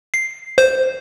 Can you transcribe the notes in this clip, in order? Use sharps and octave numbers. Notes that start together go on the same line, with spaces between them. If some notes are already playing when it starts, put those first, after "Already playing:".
C7
C5